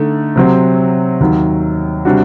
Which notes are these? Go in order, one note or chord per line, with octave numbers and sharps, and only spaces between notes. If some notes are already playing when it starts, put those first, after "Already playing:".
Already playing: D3 A3 D#4
C3 F#3 C4
D#2 D#3 F#3
C3 G3 D4 F#4